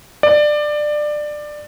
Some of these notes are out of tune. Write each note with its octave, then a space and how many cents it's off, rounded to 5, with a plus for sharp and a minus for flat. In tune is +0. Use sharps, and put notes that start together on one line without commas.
D5 +20